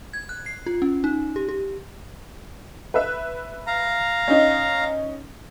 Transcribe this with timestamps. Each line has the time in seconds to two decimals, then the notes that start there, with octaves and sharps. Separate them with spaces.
0.13 G#6
0.29 F#6
0.46 C7
0.67 F4
0.82 C#4
1.04 D#4
1.36 G4
1.49 G4
2.94 B4 E5
3.67 F5 A#5
4.28 C#4 D#4